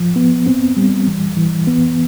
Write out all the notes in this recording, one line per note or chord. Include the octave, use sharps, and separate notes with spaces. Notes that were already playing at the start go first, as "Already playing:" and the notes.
Already playing: F3
B3
C4
G3
E3
E3
B3